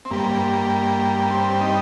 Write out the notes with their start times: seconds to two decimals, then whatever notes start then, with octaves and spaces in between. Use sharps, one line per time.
0.05 C4
0.11 G2 G3 A#3
1.19 A#3
1.30 C4
1.61 D#4